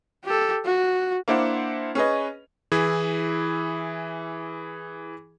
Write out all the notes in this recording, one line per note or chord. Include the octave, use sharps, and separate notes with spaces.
G4 A4
F#4
A#3 D4 E4 C5 F#5
C#4 G#4 B4 D#5
E3 E4 G#4